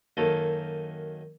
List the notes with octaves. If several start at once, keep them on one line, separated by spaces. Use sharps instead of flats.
F#2 D#3 A#3 A4